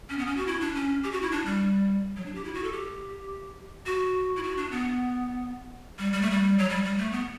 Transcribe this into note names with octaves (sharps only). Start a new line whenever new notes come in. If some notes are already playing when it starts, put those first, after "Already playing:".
C#4
B3
C#4
F#4
E4
D4
C#4
G4
F#4
E4
D4
G3
F#3
D4
G4
E4
F#4
A4
G4
F#4
E4
F#4
D4
B3
G3
G3
A3
G3
F#3
G3
G3
A3
B3